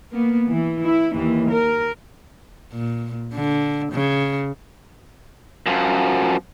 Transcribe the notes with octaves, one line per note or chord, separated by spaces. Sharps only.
A#3 B3
E3
E4
D#2 E3
A#4
A#2
D3
C#3
F#2 F3